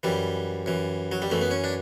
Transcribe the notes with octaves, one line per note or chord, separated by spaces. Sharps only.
F#2 E3 G3
F#2 E3
F#3
G3
F#2 E3 A3
B3
C#4
D4